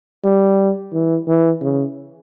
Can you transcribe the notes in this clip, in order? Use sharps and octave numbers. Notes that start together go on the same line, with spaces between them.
G3
E3
E3
C#3